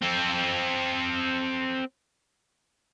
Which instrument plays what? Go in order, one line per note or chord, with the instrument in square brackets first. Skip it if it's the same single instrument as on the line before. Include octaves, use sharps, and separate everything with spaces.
[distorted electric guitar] C4 A4